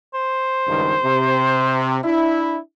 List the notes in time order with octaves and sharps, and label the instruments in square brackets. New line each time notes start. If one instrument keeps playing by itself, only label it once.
[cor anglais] C5
[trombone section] C#2 G2 D#3
C3
D4 E4